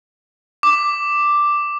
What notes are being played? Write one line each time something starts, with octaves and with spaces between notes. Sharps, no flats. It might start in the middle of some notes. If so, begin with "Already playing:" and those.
D6